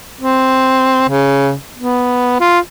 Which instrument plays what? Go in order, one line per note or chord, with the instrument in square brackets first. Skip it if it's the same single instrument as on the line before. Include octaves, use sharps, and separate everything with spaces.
[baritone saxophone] C4
C#3
B3
F4